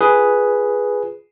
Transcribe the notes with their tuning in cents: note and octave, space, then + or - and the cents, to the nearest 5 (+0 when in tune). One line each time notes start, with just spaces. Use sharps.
F4 +0 G#4 +0 B4 +0